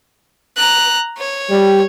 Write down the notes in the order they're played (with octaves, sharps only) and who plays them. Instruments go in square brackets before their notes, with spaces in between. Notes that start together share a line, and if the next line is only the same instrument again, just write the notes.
[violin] A#5 F#6
C#5
[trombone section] G3